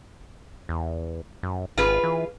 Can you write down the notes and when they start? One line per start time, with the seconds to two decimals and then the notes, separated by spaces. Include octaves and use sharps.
0.69 E2
1.43 F#2
1.77 G#1 F4 G#4 B4
2.04 E3